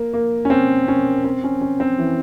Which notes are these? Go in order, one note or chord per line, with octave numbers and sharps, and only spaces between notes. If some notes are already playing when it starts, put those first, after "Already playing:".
Already playing: A#3
A#3
C#4
C4
C#4
C4
C#4
C#4
C4
E3